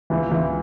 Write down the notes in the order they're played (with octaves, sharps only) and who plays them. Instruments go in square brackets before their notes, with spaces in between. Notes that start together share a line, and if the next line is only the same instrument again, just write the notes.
[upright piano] C#2 [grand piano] E3
[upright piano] C#2 [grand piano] E3